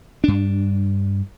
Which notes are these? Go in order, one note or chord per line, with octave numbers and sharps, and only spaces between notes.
G2 D4